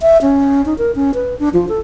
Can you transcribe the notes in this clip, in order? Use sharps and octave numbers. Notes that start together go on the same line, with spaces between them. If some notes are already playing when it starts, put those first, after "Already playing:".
E5
C#4
D#4
A#4
C#4
B4
D4
F3
A4